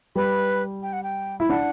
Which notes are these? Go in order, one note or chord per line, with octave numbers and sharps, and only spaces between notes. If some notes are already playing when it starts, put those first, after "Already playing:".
G3 B4
G5
F#5
G5
E4
D4 F#5